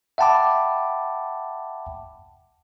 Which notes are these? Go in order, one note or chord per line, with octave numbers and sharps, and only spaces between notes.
E5 F#5 G5 A5 B5 D6